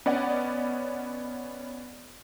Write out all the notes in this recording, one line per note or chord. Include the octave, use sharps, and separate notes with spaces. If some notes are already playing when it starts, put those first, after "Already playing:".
B3 C#4 D5 D#5 F#5